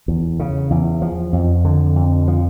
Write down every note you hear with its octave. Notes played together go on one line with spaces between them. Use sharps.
E2
C#3
E2
F3
F2
D3
F2
F3